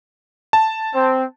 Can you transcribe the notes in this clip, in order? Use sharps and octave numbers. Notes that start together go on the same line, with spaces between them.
A5
C4